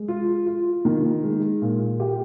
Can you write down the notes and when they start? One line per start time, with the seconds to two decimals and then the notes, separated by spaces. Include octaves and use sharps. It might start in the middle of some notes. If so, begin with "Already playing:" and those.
Already playing: G#3
0.08 F4
0.46 F4
0.85 D#3
1.23 G#3
1.61 A#2
2.00 G4